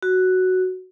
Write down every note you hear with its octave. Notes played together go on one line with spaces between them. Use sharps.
F#4